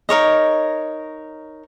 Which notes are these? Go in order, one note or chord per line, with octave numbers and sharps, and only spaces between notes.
D#4 A#4 C#5 D#5